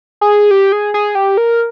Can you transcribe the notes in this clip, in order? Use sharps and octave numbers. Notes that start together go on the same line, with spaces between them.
G#4
G4
G#4
G#4
G4
A#4